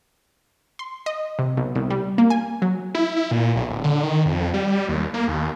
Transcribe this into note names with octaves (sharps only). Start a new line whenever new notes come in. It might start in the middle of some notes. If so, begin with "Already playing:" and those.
C6
D#5
C3
B1
C2
G3
A#3
G#5
F#3
E4
E4
A#2
B1
D1
D3
D#3
F2
G3
D#2
A#3
D#2